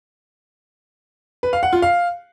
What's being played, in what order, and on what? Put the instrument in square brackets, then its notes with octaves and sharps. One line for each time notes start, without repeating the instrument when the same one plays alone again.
[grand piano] B4
F5
F#5
F4
F5